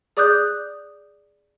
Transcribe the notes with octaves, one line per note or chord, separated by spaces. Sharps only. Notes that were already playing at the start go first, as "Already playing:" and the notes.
G#4 D5 D6 D#6 F#6 G6